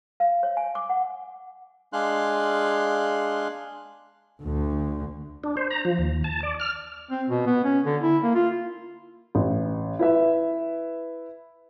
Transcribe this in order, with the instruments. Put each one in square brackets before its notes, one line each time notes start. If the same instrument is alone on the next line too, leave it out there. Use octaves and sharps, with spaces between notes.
[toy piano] F5
C#5
G#5
D6
F#5
[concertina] G#3 D4 G#4 F5 C6 F#6
[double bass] D2 D3
[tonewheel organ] D4
C5
A#5
F3
D#2
A5
D5
F6
[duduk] C4
B2
B3
C#4
D3
E4
A#3
F4
[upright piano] A1
E4 B4 E5